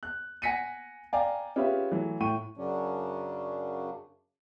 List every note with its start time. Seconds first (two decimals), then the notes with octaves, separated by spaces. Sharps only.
0.03 F#6
0.42 F#5 G#5 A#6 B6 C#7 D#7
1.13 D5 F5 G5 G#5 A#5
1.56 C#4 F4 G4 G#4 B4 E5
1.91 E3 F#3 A3
2.20 A2 E4 G5 C#6 D#7
2.57 F#2 C#3 F#3 C#4 D4